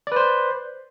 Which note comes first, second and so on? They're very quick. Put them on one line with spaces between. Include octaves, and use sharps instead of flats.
D5 B4 C5